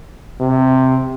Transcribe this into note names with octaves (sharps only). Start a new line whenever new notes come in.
C3